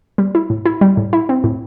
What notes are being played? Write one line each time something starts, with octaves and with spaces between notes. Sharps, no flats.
G3
E4
A2
E4
G3
A2
E4
C4
A2